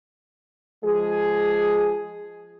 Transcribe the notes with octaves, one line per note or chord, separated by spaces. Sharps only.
F3 G#3 G#4